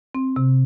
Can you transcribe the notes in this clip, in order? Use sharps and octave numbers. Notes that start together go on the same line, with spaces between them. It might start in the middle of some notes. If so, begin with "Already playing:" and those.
C4
C3